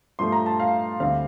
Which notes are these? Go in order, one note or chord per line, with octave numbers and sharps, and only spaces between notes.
G2 F3 A3 C6
A#5
A5
F5
D2 D3 G3 C4 F5